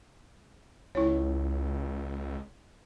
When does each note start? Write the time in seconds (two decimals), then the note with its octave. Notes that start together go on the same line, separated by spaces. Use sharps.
0.95 C#2 E4 C#5